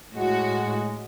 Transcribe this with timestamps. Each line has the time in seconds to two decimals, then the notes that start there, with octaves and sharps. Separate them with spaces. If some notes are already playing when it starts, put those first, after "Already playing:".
0.16 A2 G#3 F#4